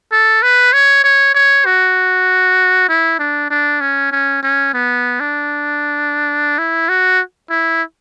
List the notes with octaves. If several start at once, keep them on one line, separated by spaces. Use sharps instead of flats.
A4
B4
C#5
C#5
C#5
F#4
E4
D4
D4
C#4
C#4
C#4
B3
D4
E4
F#4
E4